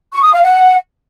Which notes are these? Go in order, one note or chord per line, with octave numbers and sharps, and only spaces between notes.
C#6
D#6
F5
F#5